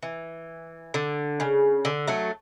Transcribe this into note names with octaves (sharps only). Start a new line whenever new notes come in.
E3
D3
C#3
D3
F#3 A3